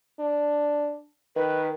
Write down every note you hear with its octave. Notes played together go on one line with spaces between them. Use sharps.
D4
D#3 B4